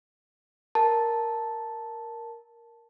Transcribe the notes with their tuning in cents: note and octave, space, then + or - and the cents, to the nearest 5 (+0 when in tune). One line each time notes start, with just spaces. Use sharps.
A#4 +0 A5 +0